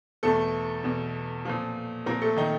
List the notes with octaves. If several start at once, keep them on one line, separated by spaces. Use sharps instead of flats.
E2 B2 A3 A4
E2 B2
A#2 F3
A#2 F3 A#3 A#4
A3 A4
D#3 D#4